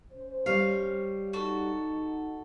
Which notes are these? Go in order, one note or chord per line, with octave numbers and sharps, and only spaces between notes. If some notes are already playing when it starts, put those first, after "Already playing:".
C#4 C5
G3 C#5 F5
D#4 F#4 A4